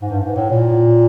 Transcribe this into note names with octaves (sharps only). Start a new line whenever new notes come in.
G#2
G2
G#2
A2
A#2